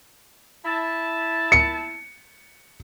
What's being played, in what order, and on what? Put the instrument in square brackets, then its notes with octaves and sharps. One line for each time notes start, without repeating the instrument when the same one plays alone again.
[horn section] E4 A5
[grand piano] C#7